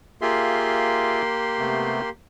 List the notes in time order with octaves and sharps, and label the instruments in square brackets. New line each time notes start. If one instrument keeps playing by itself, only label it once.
[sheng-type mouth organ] A#3 G4 C6 [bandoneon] F4 G#4 E5
[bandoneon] C3 A3 B3